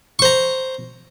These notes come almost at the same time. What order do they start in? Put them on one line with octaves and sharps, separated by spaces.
C#6 C5 A#5